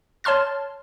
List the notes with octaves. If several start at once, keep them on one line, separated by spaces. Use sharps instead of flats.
C#5 A5 C6 F6 A6